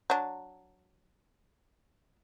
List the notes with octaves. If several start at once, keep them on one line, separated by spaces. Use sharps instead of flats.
F#3 D4